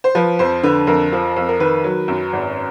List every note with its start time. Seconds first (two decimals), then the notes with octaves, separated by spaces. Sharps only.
0.04 C5
0.15 F3 B4
0.39 F2 C5
0.63 D3 B4
0.87 F2 A#4
1.12 F3
1.36 F2
1.48 A#4
1.60 D#3 B4
1.84 F#3
2.08 F#2
2.33 G#1